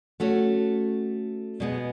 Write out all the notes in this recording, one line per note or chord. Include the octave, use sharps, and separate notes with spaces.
A3 C#4 F#4 C#5
B2 G#3 B3